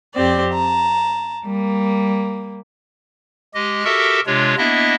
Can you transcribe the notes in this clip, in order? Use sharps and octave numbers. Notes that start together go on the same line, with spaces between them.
F2 C4 G4 D5
A5 A#5
G3 A#3
G#3 G4 D#5
F#4 G4 A4 A#4 E5 A5
C3 G#3 D4 F4 C#5
A#3 B3 D4 E4 D#5 E5